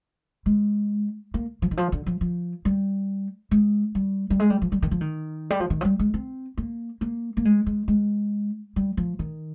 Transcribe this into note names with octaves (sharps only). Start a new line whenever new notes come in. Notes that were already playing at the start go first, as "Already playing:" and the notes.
G#3
A#3
F3
D#3
F3
D3
F3
F3
G3
G#3
G3
G3
G#3
G3
F3
G3
D#3
F3
D#3
G3
F3
D#3
F3
G3
G#3
C4
A#3
A#3
A#3
G#3
G#3
G#3
G3
F3
D#3